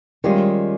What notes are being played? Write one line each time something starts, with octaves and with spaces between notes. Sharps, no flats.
D#3 G3 G#3 C#4 F4 G4 G#4